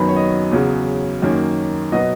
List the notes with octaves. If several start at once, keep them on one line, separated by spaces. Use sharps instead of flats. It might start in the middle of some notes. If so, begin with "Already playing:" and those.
Already playing: F#2 D#3 F#3 B3 B5
C#5
D#5
E2 C#3 F#3
F#2 D#3 A#3 C#4
B2 F#3 B3 D#5